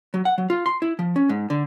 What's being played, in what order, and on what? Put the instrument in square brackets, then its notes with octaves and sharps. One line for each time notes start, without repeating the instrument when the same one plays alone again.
[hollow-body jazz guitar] F#3
F#5
F#3
F4
C6
E4
F3
C#4
G#2
D3